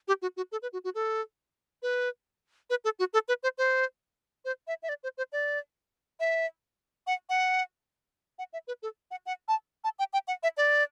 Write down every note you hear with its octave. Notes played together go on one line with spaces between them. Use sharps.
G4
F#4
F#4
A4
B4
F#4
F#4
A4
B4
B4
A4
F#4
A4
B4
C5
C5
C5
E5
E5
D5
C5
C5
D5
E5
F#5
F#5
F#5
E5
B4
A4
F#5
F#5
A5
A5
G5
G5
F#5
E5
D5